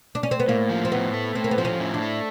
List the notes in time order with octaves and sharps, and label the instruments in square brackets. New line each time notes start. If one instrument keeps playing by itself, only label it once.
[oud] D4
C#4
C4
B3
[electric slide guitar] A2 [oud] A#3
[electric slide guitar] F3
[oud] C4
[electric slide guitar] A2 [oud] B3
[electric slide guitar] A3
[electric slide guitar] A2 [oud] C4
[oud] A#3
B3
[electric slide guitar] F3 [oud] C4
[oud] C#4
[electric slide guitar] A2
[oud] D4
[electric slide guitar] A3